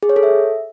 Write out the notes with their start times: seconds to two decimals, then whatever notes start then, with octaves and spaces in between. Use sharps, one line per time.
0.03 G#4
0.09 C#5
0.16 A4
0.23 E5